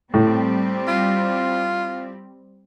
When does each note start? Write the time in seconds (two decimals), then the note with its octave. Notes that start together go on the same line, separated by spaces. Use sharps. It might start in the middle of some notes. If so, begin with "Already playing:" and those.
0.14 A2 G3 C4
0.88 F4